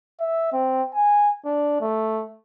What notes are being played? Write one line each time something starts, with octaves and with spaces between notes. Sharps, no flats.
E5
C4
G#5
D4
A3